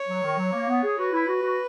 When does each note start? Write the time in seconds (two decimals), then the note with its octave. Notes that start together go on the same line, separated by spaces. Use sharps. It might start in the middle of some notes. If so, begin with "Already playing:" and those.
Already playing: C#5
0.08 F#3
0.23 D#3
0.37 F#3
0.52 A#3
0.68 B3
0.83 G#4
0.97 F#4 B4
1.13 E4
1.27 F#4
1.42 F#4